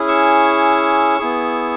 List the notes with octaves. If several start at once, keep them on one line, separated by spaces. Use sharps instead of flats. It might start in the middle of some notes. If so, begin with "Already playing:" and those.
Already playing: C#4 E4 G#4
C#6 E6
B3 E4 G#4